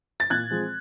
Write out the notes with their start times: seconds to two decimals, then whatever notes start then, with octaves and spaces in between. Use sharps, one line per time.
0.20 A6
0.30 A#2 F#6 G#6
0.51 F3 G#3 C4